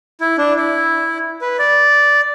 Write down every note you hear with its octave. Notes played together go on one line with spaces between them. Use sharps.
E4
D4
E4
B4
D5